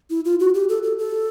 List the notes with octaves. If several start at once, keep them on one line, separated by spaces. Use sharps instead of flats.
E4
F4
F#4
G4
A4
A4
A4